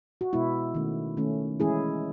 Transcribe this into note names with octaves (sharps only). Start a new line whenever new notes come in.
F#4
B2 G#3 B3 E4
D#3 A3 C#4
D#3 A3 C#4
E3 G#3 C#4 E4 G#4